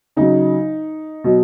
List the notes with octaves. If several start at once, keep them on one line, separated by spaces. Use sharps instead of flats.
C#3 F#3 D#4
B2 F#3